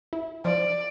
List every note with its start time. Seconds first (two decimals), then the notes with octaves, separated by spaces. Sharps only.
0.13 E4
0.45 F3 D5